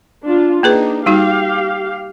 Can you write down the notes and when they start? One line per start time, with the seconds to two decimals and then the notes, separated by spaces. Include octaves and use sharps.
0.25 D4 F4
0.63 A#3 D4 D#4 G#4 B4
1.06 G3 D#4 F#4 G4 F5